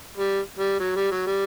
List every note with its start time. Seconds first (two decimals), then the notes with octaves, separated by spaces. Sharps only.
0.17 G3
0.58 G3
0.80 F#3
0.96 G3
1.12 F#3
1.27 G3